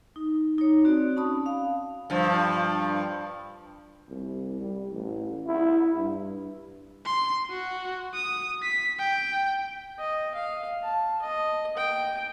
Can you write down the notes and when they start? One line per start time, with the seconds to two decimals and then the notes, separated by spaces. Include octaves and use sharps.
0.16 D#4
0.58 D#4 C#5
0.84 C4 F#4 D5
1.16 C#4 A5 B5 D#6
1.46 F5
2.10 G2 F3
4.09 C2
4.61 G3
4.92 A1
5.46 E4
5.96 G2
7.05 C6
7.50 F#4
8.14 D#6
8.63 B6
8.99 G5
9.99 D#5
10.35 F5
10.84 A5
11.22 D#5
11.77 G5